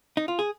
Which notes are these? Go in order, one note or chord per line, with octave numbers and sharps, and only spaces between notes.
D#4
F4
G#4